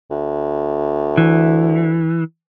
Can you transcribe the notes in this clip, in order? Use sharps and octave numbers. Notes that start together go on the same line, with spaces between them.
D2
E3